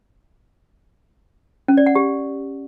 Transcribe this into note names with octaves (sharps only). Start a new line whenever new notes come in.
C#4
D5
F#5
G4